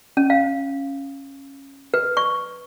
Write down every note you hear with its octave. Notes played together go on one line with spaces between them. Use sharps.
C#4
F5
B4
C#6